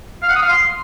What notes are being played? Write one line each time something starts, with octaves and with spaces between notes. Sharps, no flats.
F5
F#5
D#6
F5
C6